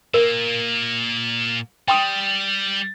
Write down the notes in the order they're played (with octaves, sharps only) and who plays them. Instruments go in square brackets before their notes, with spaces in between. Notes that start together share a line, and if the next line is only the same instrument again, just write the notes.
[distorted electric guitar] A#2 A#3 [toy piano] A#4
[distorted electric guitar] G3 [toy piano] G5 C6 D#6